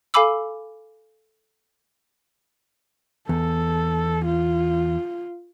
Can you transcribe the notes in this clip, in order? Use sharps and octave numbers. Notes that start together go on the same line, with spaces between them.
A4 F5 G#5 B5 D6 E6
E2 A4
F4